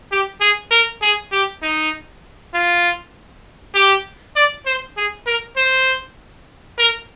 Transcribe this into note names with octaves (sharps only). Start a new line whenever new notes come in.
G4
G#4
A#4
G#4
G4
D#4
F4
G4
D5
C5
G#4
A#4
C5
A#4